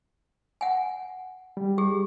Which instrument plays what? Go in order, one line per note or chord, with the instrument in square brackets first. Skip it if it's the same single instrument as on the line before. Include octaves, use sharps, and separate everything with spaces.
[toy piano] F#5 G#5
[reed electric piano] G3
[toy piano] G4 G#4